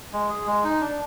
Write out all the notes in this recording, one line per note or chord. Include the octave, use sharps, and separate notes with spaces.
G#3
G#4
G#3
D#4
D4